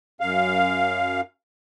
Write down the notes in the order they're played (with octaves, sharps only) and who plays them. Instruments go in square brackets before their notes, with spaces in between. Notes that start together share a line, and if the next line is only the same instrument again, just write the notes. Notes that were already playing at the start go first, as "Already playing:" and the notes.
[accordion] F#2 F5